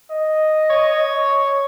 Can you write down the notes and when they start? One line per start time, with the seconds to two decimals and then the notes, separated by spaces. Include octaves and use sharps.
0.11 D#5
0.70 C#5